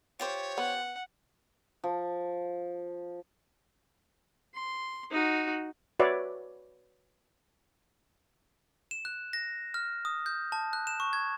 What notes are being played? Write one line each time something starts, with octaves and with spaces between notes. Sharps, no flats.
F4 G4 C5 C#5
B3 F#5
F3
C6
D#4 F#4
F#4 B4 C#5 D5 E5
E7
F#6
A#6
F6
D#6
G6
A5
F#6
E7
C#6
G#6